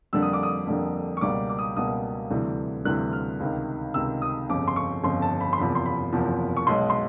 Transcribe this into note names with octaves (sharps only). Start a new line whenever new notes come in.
F2 D3 G3 A#3 E6
D#6
D6
D#6
F2 D3 G3 A#3
C#6
C#2 B2 G3 A#3 D6
D6
D#6
C#2 B2 G3 A#3 D#6
D2 C3 E3 G3
D2 C3 E3 G3 F#6
F6
C#2 C3 D#3
C#2 C3 D#3 E6
D#6
G1 F2 C#3 D6
C6
C#6
G1 F2 C#3 C6
A5
B5
C6
F#1 E2 C3 F3 B5
C6
B5
F#1 E2 C3 F3
C#6
B1 B2 G#3 C6
C6